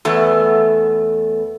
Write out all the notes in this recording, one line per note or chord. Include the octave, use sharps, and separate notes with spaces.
E2 A3 B3